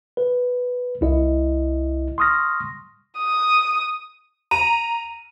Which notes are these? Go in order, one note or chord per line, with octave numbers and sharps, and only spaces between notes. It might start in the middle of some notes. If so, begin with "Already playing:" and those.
B4
C2 E4 D#5
C6 C#6 D#6 F6 A#6
D#6
A#5 D#7